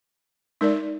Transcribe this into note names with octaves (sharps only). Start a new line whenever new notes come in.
G#3 D#4 A#4 D5